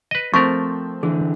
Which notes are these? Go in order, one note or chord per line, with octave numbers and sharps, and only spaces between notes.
B4 D#5
F3 A3 C4 A#4 C#6
D3 E3 G#4